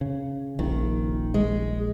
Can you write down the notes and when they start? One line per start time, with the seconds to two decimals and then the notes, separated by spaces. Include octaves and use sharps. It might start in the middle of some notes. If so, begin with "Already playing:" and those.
0.01 C#3
0.59 D#1 A#1 D#3
1.34 G#3